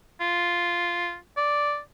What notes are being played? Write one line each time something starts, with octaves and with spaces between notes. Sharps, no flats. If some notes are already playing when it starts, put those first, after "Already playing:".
F4
D5